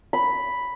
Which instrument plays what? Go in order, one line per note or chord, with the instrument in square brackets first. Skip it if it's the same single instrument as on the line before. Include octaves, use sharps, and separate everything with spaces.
[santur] B5